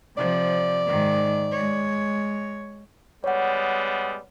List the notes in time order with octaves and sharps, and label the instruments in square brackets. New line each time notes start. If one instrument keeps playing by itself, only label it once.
[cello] C3 F3 [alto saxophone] D5
[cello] G#2 D#3
G#3 C#5
[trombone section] G3 G#3 B3 [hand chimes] C#5 F#5